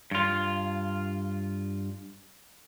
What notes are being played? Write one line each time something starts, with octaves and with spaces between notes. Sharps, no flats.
G2 F4